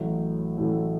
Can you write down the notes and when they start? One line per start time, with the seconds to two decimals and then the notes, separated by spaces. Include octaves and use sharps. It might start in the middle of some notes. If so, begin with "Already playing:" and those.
Already playing: A1 A2 F#3 A3
0.58 A1 A2 F#3 A3